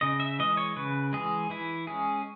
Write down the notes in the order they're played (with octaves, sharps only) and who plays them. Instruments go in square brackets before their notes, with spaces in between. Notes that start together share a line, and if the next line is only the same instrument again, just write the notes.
[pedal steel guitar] C#3 D#5
E5
E3 G#3 D#5
C#5
C#3 B4
E3 G#3 G#4
E3 E4
G#3 C#4 G#4